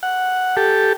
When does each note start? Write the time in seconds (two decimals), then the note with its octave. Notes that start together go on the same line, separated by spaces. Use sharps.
0.03 F#5
0.57 G4 A4